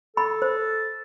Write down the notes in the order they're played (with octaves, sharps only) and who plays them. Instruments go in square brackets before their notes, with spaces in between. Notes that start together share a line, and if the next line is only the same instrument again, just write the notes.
[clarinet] A4 [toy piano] B5
[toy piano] C5